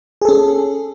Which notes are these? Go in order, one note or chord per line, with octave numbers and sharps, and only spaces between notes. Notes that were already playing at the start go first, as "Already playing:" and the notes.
C#4 G#4 A4